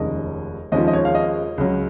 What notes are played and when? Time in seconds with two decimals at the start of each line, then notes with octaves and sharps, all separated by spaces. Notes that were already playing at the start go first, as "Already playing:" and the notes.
Already playing: F1 D#2 C#3 G#3 D#5
0.72 D#2 C#3 F3 G#3 D#5
0.88 D#5
0.93 C#5
1.05 F5
1.15 D#5
1.58 C#2 C#3 F#3